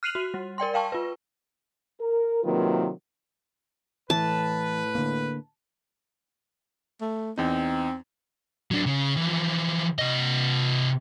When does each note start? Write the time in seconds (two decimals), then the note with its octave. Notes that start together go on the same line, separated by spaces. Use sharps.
0.03 F6 F#6 C7 D#7 F7 F#7
0.15 F#4
0.34 G3
0.58 A#4 D5 G5 C6
0.74 F5 G5 A5 C#6
0.92 F4 B4
2.00 A#4
2.43 C3 D#3 F#3 A#3 F4 B4
4.10 A2 E3 B4 A5
4.95 D3 A#3
7.01 A3
7.38 E2 C4 D#4
8.71 F#3 D4
8.86 C#3
9.16 E3 F3
9.99 C3 D#5